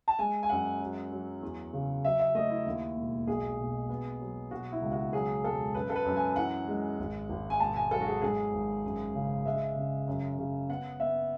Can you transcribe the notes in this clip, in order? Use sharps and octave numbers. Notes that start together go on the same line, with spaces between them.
A5
G#3 G#5
G#5
F#2 F#5
F#3
F#3
E2
C#3
F#3 E5
E5
A3 D#5
E4
D#2
E1
B1 G#4
B2
B3
F#3
B2 F#4
E4
C#2
F#4
F#3 G#4
E1 A4
F#2 B4
A4
B4
F#2
G#5
E3 F#5
G#3
G#1
G#1
G#5
E1 A5
G#5
F#3 A4
F#4
G#4
G#2 G#4
G#1
F#2
C#3
G#3 E5
C#3
F#2
C#3
B3 F#5
B3 E5